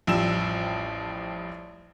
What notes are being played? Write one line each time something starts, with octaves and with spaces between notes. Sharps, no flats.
A1 F2 F3 G3 E6 E7